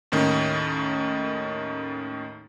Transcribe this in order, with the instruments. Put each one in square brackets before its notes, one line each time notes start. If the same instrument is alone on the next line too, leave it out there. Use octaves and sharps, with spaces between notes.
[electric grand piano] D#2 A2 D#3 C#4